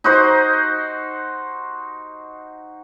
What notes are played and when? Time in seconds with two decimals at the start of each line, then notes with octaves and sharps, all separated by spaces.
0.04 D#4 F#4 C5